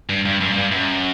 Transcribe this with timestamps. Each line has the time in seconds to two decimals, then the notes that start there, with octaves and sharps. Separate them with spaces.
0.09 G2
0.25 G2
0.41 F#2
0.49 A#2
0.56 G2
0.72 F#2